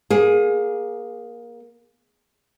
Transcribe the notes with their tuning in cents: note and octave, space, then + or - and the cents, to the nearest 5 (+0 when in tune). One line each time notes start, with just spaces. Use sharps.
A#3 +20 G#4 +0